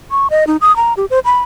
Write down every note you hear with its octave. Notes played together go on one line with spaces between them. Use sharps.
C#6
D#5
D#4
D#6
A#5
G4
C5
B5